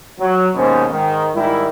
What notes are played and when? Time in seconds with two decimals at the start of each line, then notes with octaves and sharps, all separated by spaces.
0.19 F#3
0.55 D#2 G#2 B2 C#4 C5
0.90 G#2 D#3
1.34 G#2 D#3 G3 E4